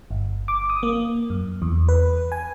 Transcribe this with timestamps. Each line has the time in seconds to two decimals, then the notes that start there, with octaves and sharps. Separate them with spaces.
0.11 G1
0.48 D6
0.70 D#6
0.83 A#3
1.30 F#2
1.62 E2
1.89 B4
2.32 G#5